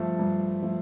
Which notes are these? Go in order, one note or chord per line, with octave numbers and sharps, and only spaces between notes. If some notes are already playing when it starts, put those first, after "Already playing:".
Already playing: G2 F3 A3 A5
G2
F3 A3